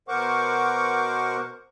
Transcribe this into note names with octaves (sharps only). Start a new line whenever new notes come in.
B2 A#4 C5 F#5 C#6 D6